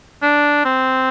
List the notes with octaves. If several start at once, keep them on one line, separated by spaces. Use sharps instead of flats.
D4
C4